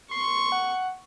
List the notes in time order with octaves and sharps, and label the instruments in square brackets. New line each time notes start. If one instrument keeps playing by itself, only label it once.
[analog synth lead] C6 [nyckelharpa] C#6
[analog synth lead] F#5